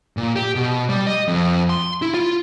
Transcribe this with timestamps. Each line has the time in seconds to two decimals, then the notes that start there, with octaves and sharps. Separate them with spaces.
0.17 A#2
0.36 G4
0.55 B2
0.89 G3
1.07 D#5
1.28 F2
1.70 C6
2.02 E4
2.14 F4